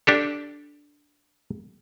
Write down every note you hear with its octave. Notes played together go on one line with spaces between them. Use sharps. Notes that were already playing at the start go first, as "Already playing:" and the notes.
D4 G4 A4